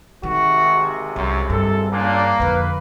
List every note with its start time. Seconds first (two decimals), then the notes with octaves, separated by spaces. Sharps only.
0.23 G#1 C3 D#3 F#4
1.16 C2 F#2
1.50 G2 A4
1.91 A#2 C#3 A#3 D4
2.40 F2 D3 B4